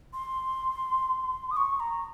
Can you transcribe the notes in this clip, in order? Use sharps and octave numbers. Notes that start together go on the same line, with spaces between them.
C6
D#6
C#6
A#5